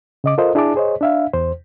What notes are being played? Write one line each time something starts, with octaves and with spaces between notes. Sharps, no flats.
C#3 D#5 D6
F4 A4 A#4 C5 D#5
D4 E4 G#4 D5 A5 D6
G#4 C5 C#5 D#5
D4 E5 F5
E2 C5